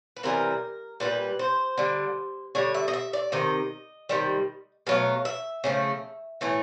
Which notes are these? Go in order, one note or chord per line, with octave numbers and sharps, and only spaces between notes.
B4
C3 E3 G3 A#4
A#2 G3 B4
C5
D3 G3
D3 G3 C#5
E5
D#5
E5
D5
C3 D#3 D#5
C3 D#3 G3
B2 F#3 A3 F5
E5
C#3 F3 A3
A2 E3 A3